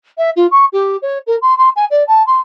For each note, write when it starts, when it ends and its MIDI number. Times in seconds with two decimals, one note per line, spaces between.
0.17 0.30 76
0.36 0.46 65
0.51 0.65 85
0.72 0.96 67
1.02 1.18 73
1.26 1.36 70
1.41 1.56 84
1.58 1.69 84
1.76 1.85 80
1.90 2.03 74
2.07 2.24 81
2.26 2.40 84